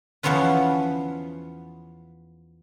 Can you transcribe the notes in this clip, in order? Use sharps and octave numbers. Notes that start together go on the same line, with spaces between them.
E2 F3 B3 C#4 F4 B4